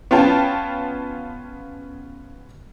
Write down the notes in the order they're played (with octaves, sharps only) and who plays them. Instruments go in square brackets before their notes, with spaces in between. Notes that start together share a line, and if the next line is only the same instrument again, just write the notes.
[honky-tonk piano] B3 C#4 F4 G5 A5